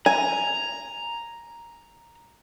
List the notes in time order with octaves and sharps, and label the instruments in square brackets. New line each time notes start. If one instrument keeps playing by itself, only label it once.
[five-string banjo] G#5 [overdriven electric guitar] A#5